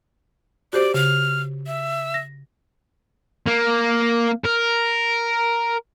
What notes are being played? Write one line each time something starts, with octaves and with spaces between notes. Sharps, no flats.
F#4 G4 C5 D5
C#3 F6
E5
A#6
A#3
A#4